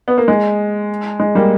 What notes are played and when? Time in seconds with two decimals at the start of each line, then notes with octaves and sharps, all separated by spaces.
0.08 B3
0.18 A#3
0.28 G#3
1.20 G#3
1.35 G3 A#3